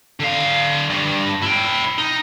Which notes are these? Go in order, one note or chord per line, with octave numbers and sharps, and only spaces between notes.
D3 F5
G2
E4 G5
D#4